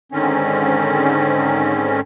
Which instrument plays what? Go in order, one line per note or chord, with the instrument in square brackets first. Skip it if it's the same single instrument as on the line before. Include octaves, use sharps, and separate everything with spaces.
[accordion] G#2 D3 D#3 C4 C#4